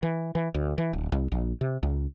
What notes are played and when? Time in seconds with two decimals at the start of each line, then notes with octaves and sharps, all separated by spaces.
0.03 E3
0.35 E3
0.54 D2
0.78 E3
0.93 D1
1.12 C2
1.32 A#1
1.61 C3
1.83 C#2